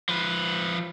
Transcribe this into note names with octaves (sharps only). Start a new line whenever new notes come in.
F3 B4